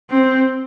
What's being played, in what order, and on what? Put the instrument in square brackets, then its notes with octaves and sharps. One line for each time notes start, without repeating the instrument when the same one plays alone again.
[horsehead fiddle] C4